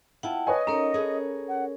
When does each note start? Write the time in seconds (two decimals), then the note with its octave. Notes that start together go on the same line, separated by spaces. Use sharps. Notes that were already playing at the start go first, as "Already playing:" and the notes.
0.23 B3 E4 F4 F#5 G5 A5
0.47 B4 C#5 D#5 G#5
0.67 C#4 D#4 G4 A4 A#4 C#5 A#5
0.94 G#4 A4 B4
1.49 F#5